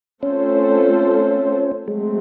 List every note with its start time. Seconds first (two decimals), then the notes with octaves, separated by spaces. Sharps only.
0.23 A3 C4 C#4 F4 A4 C5
1.87 F#3 G#3 A3 C4